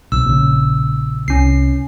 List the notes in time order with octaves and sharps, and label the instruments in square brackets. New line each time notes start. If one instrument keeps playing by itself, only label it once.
[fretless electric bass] B1 C3 [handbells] E6
[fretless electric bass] A#1 C#3
[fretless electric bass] C2 [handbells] C#4 C7